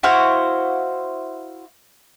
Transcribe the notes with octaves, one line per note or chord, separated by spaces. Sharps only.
E4 F#4 C5 F5